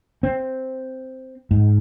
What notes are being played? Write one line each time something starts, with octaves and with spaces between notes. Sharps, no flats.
C4
G#2